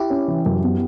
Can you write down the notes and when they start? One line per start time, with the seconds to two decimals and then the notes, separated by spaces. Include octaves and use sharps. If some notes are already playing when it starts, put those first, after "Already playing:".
Already playing: E4 G4
0.10 C#4
0.28 E3
0.46 F#2
0.64 B3